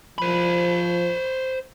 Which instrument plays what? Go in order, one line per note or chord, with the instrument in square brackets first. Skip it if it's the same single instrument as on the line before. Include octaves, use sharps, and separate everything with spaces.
[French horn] F3 [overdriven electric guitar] C5 B5